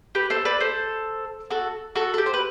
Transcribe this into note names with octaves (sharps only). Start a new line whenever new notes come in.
G4 B4
A4 C5
B4 D5
A4 C5
F#4 A4
F#4 A4
A4
G4
C5
B4